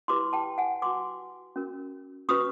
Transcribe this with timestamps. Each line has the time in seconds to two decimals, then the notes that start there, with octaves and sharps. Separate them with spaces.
0.08 E4 G4 B4 C6 D6
0.33 G5 A5
0.58 F#5 G#5
0.82 F#4 B4 C6 D6
1.56 C#4 F#4 A#4
2.29 C#4 F#4 B4 C#6 D#6